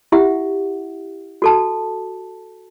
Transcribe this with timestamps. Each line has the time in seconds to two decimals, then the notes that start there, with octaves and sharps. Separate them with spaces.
0.12 E4 G4 E5 F#5
1.42 F#4 A4 A5